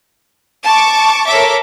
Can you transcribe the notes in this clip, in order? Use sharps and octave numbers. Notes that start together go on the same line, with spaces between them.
A5 C#6 D6
A4 A#4 C#5 E5 D6